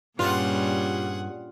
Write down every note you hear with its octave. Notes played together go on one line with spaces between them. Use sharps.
G2 A#2 G3 C#4 F4 G#4 F#5